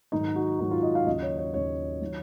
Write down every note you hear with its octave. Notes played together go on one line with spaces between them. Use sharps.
G#2 D#3 F#3 D#4
F#4
G#2 D#3 F#3 D#4
F4
D#5
F5
D#2 C#3 F#3 D#5
C#5
C#5
D#2 C#3 F#3 C#5
D#3 F#3